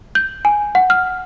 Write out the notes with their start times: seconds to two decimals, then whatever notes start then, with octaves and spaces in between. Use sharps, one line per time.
0.15 G6
0.45 G#5
0.75 F#5
0.90 F6